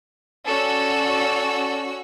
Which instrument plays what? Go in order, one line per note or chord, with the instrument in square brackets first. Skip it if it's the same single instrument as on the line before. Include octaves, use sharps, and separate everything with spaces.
[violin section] C#4 F#4 E6 [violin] A4 D5